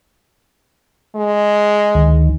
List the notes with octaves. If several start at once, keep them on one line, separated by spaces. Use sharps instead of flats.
G#3
D2 D#3